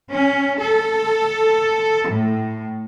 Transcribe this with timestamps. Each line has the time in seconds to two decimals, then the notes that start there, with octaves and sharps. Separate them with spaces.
0.11 C#4
0.60 A4
2.09 A2